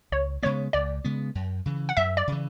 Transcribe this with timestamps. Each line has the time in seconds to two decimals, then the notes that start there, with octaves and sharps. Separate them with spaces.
0.12 C#2 C#5
0.43 C#3 G#3 B3 C#5
0.73 C#2 D5
1.04 C#3 G#3 B3
1.35 F#2
1.66 C#3 E3
1.89 F#5
1.97 F#2 E5
2.17 D5
2.27 C#3 E3